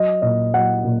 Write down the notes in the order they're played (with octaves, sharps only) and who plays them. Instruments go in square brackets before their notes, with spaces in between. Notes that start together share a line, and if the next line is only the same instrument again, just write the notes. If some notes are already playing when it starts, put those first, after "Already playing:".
Already playing: [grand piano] F#3 D#5
A#2 D#5
F#3 F#5
A#2